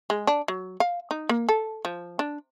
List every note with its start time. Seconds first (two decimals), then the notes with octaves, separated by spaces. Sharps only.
0.10 G#3
0.27 D4
0.48 F#3
0.80 F5
1.11 D#4
1.29 A#3
1.49 A4
1.85 F3
2.19 D4